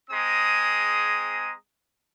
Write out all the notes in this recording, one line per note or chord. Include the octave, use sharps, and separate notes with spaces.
G#3 C4 G#4 A#5 D#6